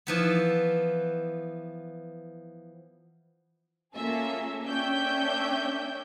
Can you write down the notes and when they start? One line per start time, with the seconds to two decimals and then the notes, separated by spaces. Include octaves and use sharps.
0.07 E3 F3 B3
3.94 A#3 C#4 F4 G#4 A4 E5
4.64 A#3 C#4 D4 E5 G5 G6